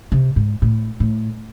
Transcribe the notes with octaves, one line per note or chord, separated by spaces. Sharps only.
C3
G#2
A2
A2